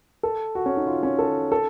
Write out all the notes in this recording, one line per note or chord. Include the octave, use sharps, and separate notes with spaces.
A4
F#4
C#4
D#4
F4
C#4
A4
A4